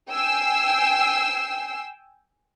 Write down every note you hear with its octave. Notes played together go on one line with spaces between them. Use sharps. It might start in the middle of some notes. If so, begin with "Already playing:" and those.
G5 G#5 E6 C7